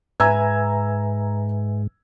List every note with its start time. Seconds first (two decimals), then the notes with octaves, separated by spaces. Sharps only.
0.20 G#2 B4 E5 G#5 A#5 E6 G#6